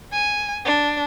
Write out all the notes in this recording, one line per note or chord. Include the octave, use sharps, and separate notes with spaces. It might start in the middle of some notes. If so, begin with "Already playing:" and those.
G#5
D4